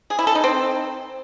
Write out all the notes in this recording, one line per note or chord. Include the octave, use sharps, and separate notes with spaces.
G#4
E4
A4
D#4
C4